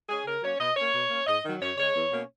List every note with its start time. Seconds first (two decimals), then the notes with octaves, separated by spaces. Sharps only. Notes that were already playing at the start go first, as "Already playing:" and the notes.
0.09 G#3 C#4 G#4
0.26 C#3 A#4
0.42 F#3 A#3 C#4 C#5
0.60 B2 D#5
0.76 A#3 C#4 C#5
0.93 B2
1.10 A#3 C#4
1.27 G#2 D#5
1.44 D#3 F#3
1.61 F#2 C#5
1.78 C#3 G#3 C#5
1.95 E2
2.12 B2 A#3 C#4